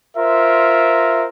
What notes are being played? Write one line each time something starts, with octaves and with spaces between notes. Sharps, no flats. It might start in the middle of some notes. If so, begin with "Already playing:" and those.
F4 A#4 C5 E5